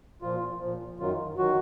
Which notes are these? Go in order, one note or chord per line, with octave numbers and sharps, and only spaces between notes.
A#2 F3 F4
A#2 F3
F#2 D#3 F#3 F4
D#3 F#3 F#4